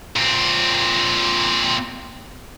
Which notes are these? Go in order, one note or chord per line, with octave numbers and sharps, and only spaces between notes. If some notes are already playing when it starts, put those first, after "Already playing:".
A#2 C4